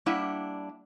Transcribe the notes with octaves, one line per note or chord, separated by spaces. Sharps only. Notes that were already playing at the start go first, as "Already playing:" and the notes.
G3 A#3 D4 E4 E5 F#5